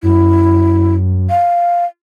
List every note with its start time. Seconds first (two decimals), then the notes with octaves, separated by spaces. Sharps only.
0.03 F#2 E4
1.30 F5